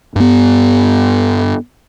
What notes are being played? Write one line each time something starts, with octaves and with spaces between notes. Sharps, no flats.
G2 B3